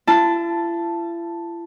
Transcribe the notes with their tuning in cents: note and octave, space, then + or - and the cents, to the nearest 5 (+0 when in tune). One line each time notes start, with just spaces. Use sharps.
E4 +45 A5 +0